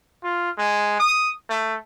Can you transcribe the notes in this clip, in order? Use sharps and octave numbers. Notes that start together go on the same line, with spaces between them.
F4
G#3
D#6
A3